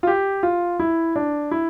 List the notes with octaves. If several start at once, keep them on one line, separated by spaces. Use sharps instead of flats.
F4
G4
F4
E4
D4
E4